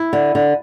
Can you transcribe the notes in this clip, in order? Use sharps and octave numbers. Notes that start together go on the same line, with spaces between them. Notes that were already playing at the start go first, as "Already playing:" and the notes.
Already playing: E4
D3
D3